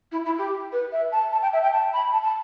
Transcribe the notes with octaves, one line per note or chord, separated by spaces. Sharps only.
E4
E4
G4
B4
E5
A5
A5
G5
E5
G5
A5
B5
A5
A5